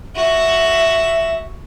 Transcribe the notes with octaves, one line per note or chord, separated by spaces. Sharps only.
F#4 E5 E7